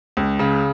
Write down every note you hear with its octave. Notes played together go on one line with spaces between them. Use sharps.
C#2
C#3